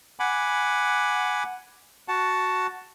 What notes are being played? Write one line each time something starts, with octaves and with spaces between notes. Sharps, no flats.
F#5 G#5 B5 D6
F#4 F#5 A5